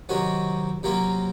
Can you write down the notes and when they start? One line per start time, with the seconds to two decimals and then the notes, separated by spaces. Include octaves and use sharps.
0.09 C3 D#3 F#3 C#4 F#4
0.83 C3 F#3 A#3 C#4 F4